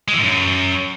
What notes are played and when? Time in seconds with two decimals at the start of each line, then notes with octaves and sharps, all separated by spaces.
0.08 G#3
0.13 E3
0.18 G#2
0.23 F#2